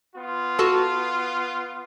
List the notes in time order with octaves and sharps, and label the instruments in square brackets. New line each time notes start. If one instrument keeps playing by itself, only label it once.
[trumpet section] B3 F4
[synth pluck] F#4 A4 A5